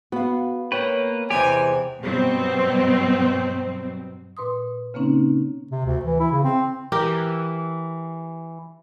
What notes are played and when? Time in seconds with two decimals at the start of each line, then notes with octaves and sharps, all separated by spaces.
0.12 B3 F#4 F5
0.72 A#3 B4 C#5 G5 C#6
1.30 E2 C3 E3 G#3 G4 C5 G#5
2.01 G2 B2 F#3 C4
4.37 A#2 B4 C6 D#6
4.94 C#3 A#3 C4 C#4 D#4
5.71 C3
5.86 D2
6.05 E3
6.20 E4
6.32 C#3
6.44 C4
6.92 E3 G4 A#4